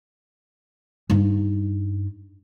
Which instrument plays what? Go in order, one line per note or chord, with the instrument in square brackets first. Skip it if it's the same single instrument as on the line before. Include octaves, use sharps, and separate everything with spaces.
[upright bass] G2 D#4